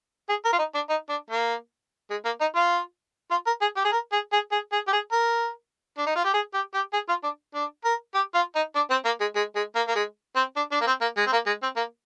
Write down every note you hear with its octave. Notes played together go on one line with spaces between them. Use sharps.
G#4
A#4
F4
D#4
D4
D#4
D4
A#3
G#3
A#3
D#4
F4
F4
A#4
G#4
G4
G#4
A#4
G#4
G#4
G#4
G#4
G4
G#4
A#4
D4
D#4
F4
G4
G#4
G4
G4
G#4
F4
D4
D4
A#4
G4
F4
D#4
D4
C4
A#3
G#3
G#3
G#3
A#3
A#3
G#3
C4
D4
D4
A#3
C4
A#3
G#3
C4
A#3
G#3
C4
A#3